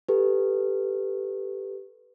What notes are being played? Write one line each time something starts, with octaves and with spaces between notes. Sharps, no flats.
G4 A4 B4